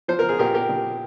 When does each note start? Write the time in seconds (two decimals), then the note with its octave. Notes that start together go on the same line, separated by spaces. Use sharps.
0.08 F3 C5
0.19 A#4
0.29 G#4
0.39 A#2 G4 A#4
0.54 G4 A#4
0.69 A#1